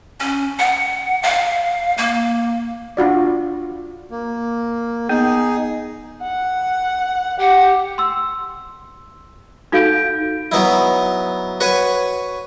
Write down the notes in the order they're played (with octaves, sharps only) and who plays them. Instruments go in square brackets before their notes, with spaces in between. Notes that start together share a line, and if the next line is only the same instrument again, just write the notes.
[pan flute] C#4
F#5
F5
A#3
[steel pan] D4 F4 F#4 D5
[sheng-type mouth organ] A#3
[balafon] B3 [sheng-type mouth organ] D#4 G#4
[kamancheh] F#5
[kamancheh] G4 [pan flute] F#5
[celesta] C6 E6
D#4 F#4 A4 F5 G6 D7
[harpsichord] F#3 B3 D#4 E4
F#4 B4 C#5 G#5